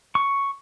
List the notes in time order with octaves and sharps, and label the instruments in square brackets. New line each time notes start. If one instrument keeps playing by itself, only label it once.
[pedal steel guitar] C#6